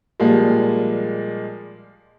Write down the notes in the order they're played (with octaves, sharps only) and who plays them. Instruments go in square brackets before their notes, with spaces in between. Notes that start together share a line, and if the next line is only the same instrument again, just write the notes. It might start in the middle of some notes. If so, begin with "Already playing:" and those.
[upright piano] A#2 F3 G3 G#3 A#3